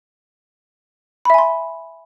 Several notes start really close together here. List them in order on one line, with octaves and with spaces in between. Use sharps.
B5 E5 G#5 C6